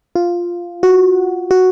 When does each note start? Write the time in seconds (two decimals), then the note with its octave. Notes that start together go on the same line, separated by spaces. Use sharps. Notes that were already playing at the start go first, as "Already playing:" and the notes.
0.16 F4
0.83 F#4
1.51 F#4